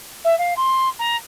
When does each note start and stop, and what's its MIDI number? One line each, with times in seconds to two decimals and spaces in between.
0.24 0.34 76
0.38 0.53 77
0.56 0.88 84
0.99 1.16 82